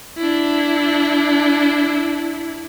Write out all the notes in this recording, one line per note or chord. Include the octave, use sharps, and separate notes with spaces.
D4 E4